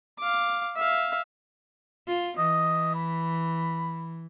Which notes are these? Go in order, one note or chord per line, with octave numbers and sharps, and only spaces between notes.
F5 D6
E5 F5
F4
E3 D#5
B5